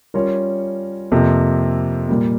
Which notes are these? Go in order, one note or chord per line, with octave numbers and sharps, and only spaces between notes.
G3 C#4 F4 A#4 C#5
F2 C3 F3 A#3
A#2 G3 A#3